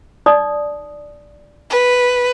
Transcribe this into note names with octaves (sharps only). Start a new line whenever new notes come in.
D#4 D5 D#6
B4